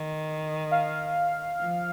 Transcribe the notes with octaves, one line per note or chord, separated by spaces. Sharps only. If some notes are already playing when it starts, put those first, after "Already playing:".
Already playing: D#3
F5
F3